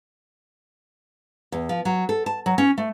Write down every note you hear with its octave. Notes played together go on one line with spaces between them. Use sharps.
E2
F3
F#3
A4
A5
F#3
C#4
A3